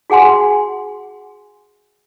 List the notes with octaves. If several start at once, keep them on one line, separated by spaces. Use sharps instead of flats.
F#4 G#4 F#5 G#5 C6